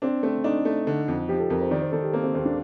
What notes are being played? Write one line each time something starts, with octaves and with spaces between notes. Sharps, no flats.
C4 D4
A3 C4
D4 D#4
A3
D3
F2
F3 G4
A4
F2 A#4
C5
D#3 D5
C5
D#3 A4
G4
A#3 C4
C4
D#2 C4
D4